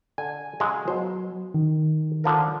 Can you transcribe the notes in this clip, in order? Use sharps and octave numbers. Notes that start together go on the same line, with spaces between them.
D3 G#5
C#3 F#3 G#3
B2 F#3 C5
D#3
D3 F3 A#4